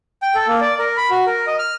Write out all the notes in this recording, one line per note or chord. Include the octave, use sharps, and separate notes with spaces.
G5
A4
A#3
D5
A#4
B5
F#4
A#4
D#5
F6